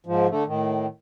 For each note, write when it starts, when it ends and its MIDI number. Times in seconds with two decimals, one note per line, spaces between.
0.06 0.27 44
0.06 0.27 53
0.30 0.44 50
0.30 0.44 57
0.46 0.87 45
0.46 0.87 51